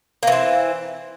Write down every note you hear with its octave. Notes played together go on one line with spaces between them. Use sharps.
E3 A#3 C4